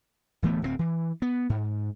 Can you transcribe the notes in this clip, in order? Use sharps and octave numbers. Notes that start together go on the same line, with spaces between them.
D1 E3 A3 B3
D1 G2 C4
E3
B3
G#2